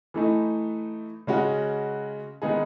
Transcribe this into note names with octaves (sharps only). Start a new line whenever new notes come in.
E3 A3 D#4
C#3 G#3 C#4 F#4
D#3 G#3 B3 D#4 G#4